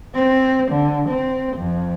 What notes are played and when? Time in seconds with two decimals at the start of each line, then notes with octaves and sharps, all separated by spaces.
0.15 C4
0.71 D3
1.08 C4
1.56 F2